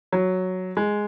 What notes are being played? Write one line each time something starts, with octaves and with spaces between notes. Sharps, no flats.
F#3
G#3